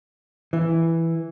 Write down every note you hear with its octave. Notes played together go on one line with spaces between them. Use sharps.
E3